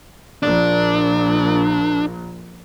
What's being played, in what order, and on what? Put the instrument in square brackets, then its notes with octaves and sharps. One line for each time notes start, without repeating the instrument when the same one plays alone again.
[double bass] A#1 A#2 [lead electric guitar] D4